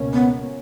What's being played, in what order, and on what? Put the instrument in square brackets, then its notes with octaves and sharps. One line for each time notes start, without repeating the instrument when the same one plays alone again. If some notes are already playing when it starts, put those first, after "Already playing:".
Already playing: [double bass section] C#2 B2 A#3 C#4
[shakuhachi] B3